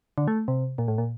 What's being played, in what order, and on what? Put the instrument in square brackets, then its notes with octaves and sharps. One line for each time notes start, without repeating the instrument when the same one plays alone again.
[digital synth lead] D3
A3
C3
A#2
A2
A#2